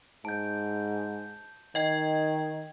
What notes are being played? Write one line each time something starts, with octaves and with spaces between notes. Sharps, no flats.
G#2 A5 G6
D#3 D#5 G5 G#6